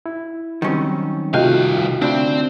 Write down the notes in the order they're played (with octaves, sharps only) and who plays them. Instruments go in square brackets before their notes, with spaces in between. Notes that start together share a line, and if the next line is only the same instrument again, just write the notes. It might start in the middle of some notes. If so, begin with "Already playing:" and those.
[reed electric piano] E4
[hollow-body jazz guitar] D#3 C#4 [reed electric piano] F#3 G3 C4
[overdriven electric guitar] C2 F5 [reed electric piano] C3 A3 G5 [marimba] F4 F#4 D#5
[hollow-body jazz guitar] D2 D4 E4 [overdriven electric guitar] C4